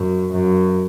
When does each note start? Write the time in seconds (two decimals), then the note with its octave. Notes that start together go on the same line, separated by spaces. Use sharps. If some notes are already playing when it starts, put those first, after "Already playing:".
Already playing: F#2
0.32 F#2